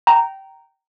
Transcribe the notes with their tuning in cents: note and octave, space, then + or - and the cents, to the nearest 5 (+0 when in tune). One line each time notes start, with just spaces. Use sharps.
G5 -20 A#5 -5